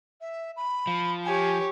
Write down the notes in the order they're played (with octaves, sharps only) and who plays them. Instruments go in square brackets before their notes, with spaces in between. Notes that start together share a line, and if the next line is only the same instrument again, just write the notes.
[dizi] E5
B5
[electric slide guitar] F3
[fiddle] G4 C#5 [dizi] G#5